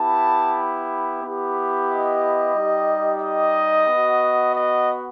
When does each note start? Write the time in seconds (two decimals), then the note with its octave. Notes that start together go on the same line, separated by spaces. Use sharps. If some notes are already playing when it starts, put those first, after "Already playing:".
Already playing: B3 E4 G4 A5
1.24 B3 E4 G4
1.90 D#5
2.56 G3 D#4 G4
3.23 D#5
3.89 B3 F#4
4.55 D#5